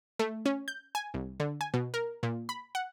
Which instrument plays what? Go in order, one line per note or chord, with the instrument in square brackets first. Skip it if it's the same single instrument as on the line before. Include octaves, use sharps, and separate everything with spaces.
[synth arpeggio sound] A3
C#4
G6
G#5
C2
D3
G#5
B2
A#4
A#2
B5
F#5